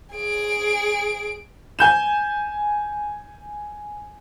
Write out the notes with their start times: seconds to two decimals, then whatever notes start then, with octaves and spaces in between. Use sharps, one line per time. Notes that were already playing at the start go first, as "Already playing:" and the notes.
0.14 G#4 D7
1.79 G#5 G6 E7